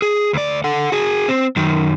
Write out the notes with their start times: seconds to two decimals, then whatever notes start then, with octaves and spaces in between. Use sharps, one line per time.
0.02 G#4
0.33 D2 D5
0.64 A4 F#5
0.92 F#4 G#4
1.29 C4
1.56 F#2 D#3